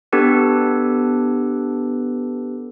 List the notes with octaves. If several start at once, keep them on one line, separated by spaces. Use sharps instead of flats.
B3 D4 G4 A4 B4